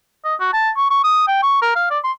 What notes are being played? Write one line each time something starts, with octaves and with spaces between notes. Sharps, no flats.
D#5
F#4
A5
C#6
C#6
D#6
G5
C#6
A#4
F5
D5
C6